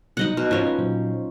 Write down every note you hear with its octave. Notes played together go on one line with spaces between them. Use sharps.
B2 F#3 G3 D#4 D#5 F#5
B2 F6
G#2 F3 C#4
B4
A#2 F#3 C5